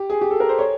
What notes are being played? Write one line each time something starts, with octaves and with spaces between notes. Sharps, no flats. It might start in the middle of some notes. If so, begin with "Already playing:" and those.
Already playing: G4
G#4
G4
A4
A#4
C5
C#5